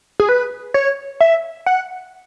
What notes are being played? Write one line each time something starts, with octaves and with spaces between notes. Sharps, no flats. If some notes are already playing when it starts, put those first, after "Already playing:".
G#4
B4
C#5
E5
F#5